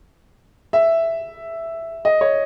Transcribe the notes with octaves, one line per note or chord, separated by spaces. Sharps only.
E5
D#5
C#5